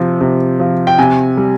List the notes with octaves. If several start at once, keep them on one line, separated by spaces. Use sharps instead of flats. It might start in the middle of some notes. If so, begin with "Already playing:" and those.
Already playing: C3 F3
C3
F3
G5
C3 G#5
G3